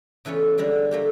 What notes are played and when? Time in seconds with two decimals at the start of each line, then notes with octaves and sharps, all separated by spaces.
0.25 C#3 E3 A3 B3 C#4
0.58 D3 G3 G#3 G#4
0.91 A3 A#3 G4